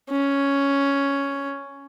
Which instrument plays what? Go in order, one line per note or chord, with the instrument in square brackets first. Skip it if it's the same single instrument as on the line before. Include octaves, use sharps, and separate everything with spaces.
[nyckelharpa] C#4